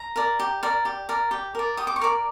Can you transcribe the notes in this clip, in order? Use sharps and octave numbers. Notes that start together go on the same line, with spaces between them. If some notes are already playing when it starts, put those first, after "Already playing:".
Already playing: A#5
A#4 D5
G4
A#4 D5
G4
A#4 D5
G4
A#4 D5
G4 D#6
D6
C#6
A#4 D5 D6